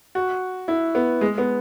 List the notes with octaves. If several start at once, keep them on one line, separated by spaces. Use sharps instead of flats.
F#4
E4
B3
G#3
B3